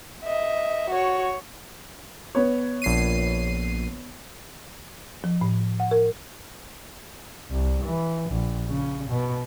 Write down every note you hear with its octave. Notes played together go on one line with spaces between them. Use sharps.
D#5 E5
F#4 C#5
B3 C#5
A#1 C7 D#7
F3
A2
F#5
A#4
C2
E3
A#1
C#3
B2